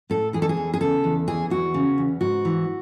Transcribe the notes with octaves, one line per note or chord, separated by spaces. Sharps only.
A2 A4
E3 G#4
A4
G#4
E2
G#4
C#3 A4
E2
E3 G#4
E2 F#4
C#3
E2
G#2 F#4
E3